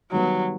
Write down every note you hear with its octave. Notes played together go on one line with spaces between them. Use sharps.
D#3 F#3 G3 B3